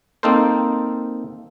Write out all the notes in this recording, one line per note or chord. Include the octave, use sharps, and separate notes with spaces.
A#3 C4 D#4 A4 A#4 C5